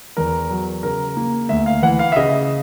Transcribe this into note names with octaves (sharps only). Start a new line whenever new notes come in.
E2 A#4
F#3
C#3 A#4
A#3
D2 E5
F5
E3 F#5
F5
E5
C#3 D#5